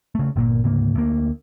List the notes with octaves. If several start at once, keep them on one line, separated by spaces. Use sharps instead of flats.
C#3 A3
G1 A#2 A#3
D2 G#2 C#3 A#3
D2 A#3